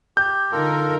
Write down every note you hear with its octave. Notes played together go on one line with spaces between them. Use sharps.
G4 G6
D3 D#4 F4 A4 A#4